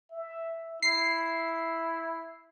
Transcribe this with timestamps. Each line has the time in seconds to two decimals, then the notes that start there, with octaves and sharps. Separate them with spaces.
0.12 E5
0.82 E4 C7